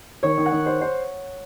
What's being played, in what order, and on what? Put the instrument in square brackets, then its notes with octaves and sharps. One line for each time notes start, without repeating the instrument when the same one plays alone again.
[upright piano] D#3 [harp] C#5
[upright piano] D#3
[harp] F#5
[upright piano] D#3
C5
C5